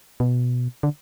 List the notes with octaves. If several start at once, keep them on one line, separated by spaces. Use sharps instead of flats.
B2
D3